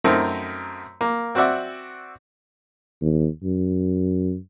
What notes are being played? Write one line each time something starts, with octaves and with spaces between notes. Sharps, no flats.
F#2 A3 C4 D#4 A#4
A#3
C4 F#4 D5 E5 F#5
D#2
F#2